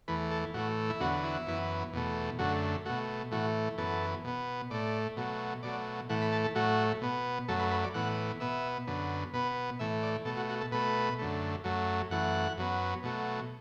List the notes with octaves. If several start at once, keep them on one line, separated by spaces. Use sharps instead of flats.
E2 E3 A3 B4
A4
A2 E3 A3 F#4
E4
E2 D3 F#3 B3 F#4
E4
F#2 E3 B3
E2 B2 A3
F#2 D3 A3 F#4
B2 A3 F#4
A2 E3 A3 F#4
F#2 E3 B3 A4
B2 B3
A2 A3 D5
B2 F#3 A3
B2 F#3 A3 D5
A2 E3 A3 F#5
B5
A5
A4
A2 F#3 A3 F#4
B2 B3
F#2 F#3 A3 A4
B4
B4
D5
A2 E3 B3 F#5
B2 B3 E5
F#2 D3 B3
B2 B3 B4
A2 E3 A3 E5
D5
B2 A3 A4
F#4
F#4
A4
B2 A3 B4
F#2 D3 A3
F#2 F#3 A3
F#2 E3 A3 F#5
F#2 F#3 B3
B2 F#3 A3